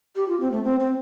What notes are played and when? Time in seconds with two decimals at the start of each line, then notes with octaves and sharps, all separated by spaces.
0.15 G4
0.28 F4
0.40 C4
0.51 A3
0.64 C4
0.80 C4